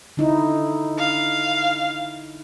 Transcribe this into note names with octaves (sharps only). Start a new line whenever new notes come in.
D3 D#4 E4
F5